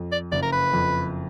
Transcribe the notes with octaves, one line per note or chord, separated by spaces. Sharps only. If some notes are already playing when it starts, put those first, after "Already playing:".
Already playing: F2
D5
F#1 D5
A#4
B4
F2